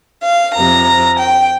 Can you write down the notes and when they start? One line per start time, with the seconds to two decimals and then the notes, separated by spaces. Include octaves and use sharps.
0.23 F5
0.55 F2 C3 F3 A#5
1.19 G5